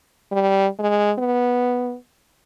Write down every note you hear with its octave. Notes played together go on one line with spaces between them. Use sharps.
G3
G#3
B3